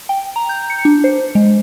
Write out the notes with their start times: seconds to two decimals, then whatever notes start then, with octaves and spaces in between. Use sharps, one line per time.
0.09 G5
0.36 A#5
0.49 G6
0.70 C#7
0.85 D4
1.04 C5
1.35 G#3